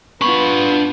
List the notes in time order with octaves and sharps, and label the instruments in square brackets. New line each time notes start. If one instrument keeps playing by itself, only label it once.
[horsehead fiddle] B3 F4 [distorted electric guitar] D4 B5 [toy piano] C#6